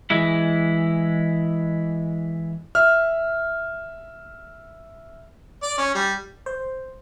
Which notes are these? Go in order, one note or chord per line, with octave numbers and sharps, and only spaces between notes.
E3 G#3 E4
E5 F6
D5
C#4
G3
C5